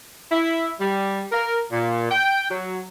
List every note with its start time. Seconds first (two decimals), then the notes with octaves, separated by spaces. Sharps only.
0.31 E4
0.80 G3
1.32 A#4
1.72 A#2
2.11 G5
2.50 F#3